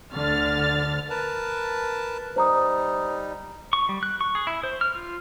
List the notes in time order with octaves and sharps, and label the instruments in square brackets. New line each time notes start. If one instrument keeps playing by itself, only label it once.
[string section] D2 D3 F6 A6
[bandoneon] A#4 B4 A5
[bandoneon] G3 D#4 [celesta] C5 A#5 D#6
[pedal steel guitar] C#6
G3
F#6
C#6
G#4
E4
C5
F6
F4